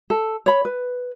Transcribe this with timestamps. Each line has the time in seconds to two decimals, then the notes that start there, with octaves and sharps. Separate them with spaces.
0.10 A4
0.46 C#5 B5
0.65 B4